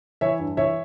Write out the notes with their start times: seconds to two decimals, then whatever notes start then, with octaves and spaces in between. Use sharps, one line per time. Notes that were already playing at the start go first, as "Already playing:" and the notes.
0.21 E3 C#5 E5
0.39 G2
0.57 E3 C#5 E5